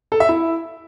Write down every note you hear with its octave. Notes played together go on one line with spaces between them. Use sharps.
A4
E5
E4